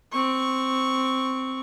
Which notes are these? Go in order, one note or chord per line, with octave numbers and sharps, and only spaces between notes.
C4 C#6